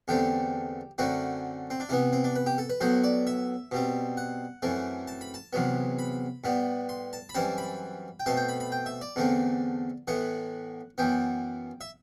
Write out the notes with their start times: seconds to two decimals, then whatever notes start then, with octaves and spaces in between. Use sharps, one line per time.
0.08 E2 D3 A3 C4 G4
0.98 F#2 D3 A3 C4 F#4
1.70 C4
1.80 D4
1.89 C3 E3 B3 E4
2.13 C4
2.24 D4
2.36 B4
2.46 G4
2.58 A4
2.70 B4
2.81 A2 F#3 B3 C5
3.04 D5
3.27 E5
3.71 B2 G3 C4
4.17 F#5
4.62 F#2 E3 A3 C4
5.07 A5
5.21 B5
5.34 A5
5.53 E2 C3 F#3 B3
5.99 B5
6.44 A2 G3 B3
6.89 C6
7.13 A5
7.29 B5
7.34 F#2 E3 G3 C4 A5
7.58 B5
8.20 G5
8.26 B2 A3 C4 A5
8.37 G5
8.48 B5
8.60 B5
8.72 G5
8.86 E5
9.01 D5
9.16 E2 D3 A3 C4
10.08 A2 E3 B3 F#5
10.98 F#2 E3 B3 G5
11.81 E5